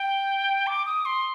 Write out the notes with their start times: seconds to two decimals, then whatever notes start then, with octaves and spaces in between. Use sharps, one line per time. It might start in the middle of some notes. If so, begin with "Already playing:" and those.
Already playing: G5
0.67 D6
0.86 D#6
1.05 C6